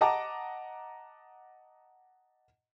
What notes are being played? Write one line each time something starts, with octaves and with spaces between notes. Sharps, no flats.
D#5 F#5 A5 A#5 D6